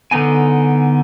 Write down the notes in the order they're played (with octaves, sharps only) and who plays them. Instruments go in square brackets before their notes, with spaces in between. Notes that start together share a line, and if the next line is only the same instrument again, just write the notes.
[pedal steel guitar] D3 B3 D#4 G#5